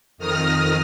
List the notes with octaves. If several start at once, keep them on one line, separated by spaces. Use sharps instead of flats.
F2 D#3 D#6 F6 A#6